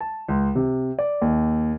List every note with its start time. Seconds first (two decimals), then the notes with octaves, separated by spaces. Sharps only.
0.01 A5
0.28 C#2
0.56 C3
0.99 D5
1.21 D#2